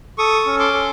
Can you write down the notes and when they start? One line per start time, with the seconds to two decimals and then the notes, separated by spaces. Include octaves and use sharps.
0.18 A4 C#6 D#6
0.46 C#4
0.59 C6 D6
0.74 A4